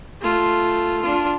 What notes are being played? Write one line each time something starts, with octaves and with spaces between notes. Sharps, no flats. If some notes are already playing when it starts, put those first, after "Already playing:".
A3 F4
D4 F4